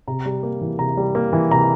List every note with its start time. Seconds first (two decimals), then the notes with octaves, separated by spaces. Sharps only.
0.07 C3 A#5
0.26 G3
0.43 A#3
0.61 E3
0.79 C3 A#5
0.97 G3
1.15 A#3
1.33 E3
1.51 C3 A#5